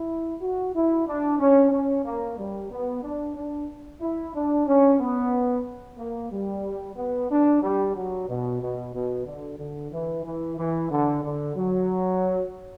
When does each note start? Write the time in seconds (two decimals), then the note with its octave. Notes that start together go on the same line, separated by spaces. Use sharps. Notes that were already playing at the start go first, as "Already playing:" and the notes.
Already playing: E4
0.41 F#4
0.74 E4
1.07 D4
1.39 C#4
1.71 C#4
2.05 A#3
2.38 G3
2.70 B3
3.03 D4
3.35 D4
4.01 E4
4.34 D4
4.67 C#4
5.00 B3
5.98 A#3
6.31 G3
6.96 B3
7.30 D4
7.62 G3
7.95 F#3
8.28 B2
8.61 B2
8.94 B2
9.26 D3
9.58 D3
9.92 E3
10.24 E3
10.57 E3
10.90 D3
11.23 D3
11.56 F#3